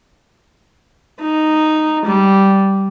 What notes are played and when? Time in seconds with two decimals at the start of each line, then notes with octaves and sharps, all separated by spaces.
1.21 D#4
2.05 G3